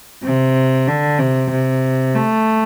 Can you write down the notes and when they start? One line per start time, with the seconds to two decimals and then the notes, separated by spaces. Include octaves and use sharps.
0.24 C3
0.88 D3
1.19 C3
1.51 C3
2.15 A3